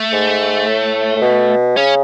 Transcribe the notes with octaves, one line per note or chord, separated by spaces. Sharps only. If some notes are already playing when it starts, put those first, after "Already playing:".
Already playing: A3
G#2
A2
A2
B2
C#3 C#4